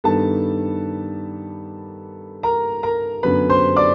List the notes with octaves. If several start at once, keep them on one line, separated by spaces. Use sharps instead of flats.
G2 D#3 G3 B3 A4 A5
A#4 A#5
A#4 A#5
F#2 D3 F#3 B3 B4 B5
C5 C6
D5 D6